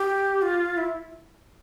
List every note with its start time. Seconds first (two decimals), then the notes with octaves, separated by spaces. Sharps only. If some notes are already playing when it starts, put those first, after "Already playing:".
Already playing: G4
0.42 F4
0.77 E4